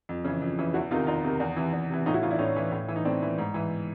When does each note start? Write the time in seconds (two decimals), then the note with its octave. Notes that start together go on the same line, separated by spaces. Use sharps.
0.09 F2
0.24 C#3 E3
0.42 F2
0.59 C#3 E3
0.74 E2 E4 F#4
0.91 C3 D#3 D#4 F4
1.07 E2 D#4 F4
1.24 C3 D#3
1.40 E2
1.56 C3 E3
1.73 E2
1.90 C3 E3
2.06 A2 D#4 F4
2.14 E4 F#4
2.22 E3 D#4 F4
2.31 D4 E4
2.39 A2 C#4 D#4
2.56 E3
2.72 A2
2.88 E3
2.96 D#4
3.05 A2 C4 D4
3.22 E3
3.38 G#2
3.54 E3